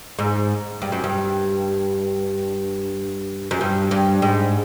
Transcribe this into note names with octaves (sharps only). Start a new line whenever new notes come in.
G#2
G2
F#2
G2
F#2
G2
G2
G#2